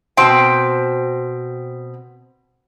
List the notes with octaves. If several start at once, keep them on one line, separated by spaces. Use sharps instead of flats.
B2 C4 C5 G5